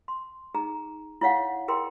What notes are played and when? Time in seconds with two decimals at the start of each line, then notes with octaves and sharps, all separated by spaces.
0.08 C6
0.54 D#4 G#4 A#5
1.21 E4 G#4 C#5 F5 F#5
1.68 E4 G#4 A#4 G5 C6